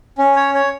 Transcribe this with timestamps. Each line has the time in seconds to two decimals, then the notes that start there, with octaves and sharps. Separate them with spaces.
0.18 C#4
0.36 C#5
0.55 C#5